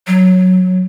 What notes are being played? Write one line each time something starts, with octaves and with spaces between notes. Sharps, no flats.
F#3